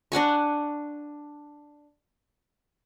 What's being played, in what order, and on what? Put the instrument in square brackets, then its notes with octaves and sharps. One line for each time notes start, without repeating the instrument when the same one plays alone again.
[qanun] D4 F#5 G#5 C#6